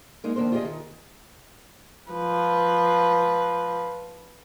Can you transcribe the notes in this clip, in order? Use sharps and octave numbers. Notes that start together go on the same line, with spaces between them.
G#3 A#3 D#4
F2 D#3 A#3 D4 C5
F4 G4 G#4 D5 D#5 F5
D#3
F3 B4